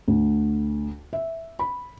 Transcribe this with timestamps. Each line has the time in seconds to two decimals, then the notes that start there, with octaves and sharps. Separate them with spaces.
0.08 D2
1.13 E5
1.59 B5